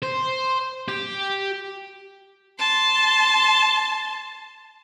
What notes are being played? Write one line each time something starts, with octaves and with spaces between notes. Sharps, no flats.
C5
G4
A5 C6